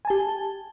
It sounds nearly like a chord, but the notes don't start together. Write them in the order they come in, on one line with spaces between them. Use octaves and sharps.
G#5 A5 G4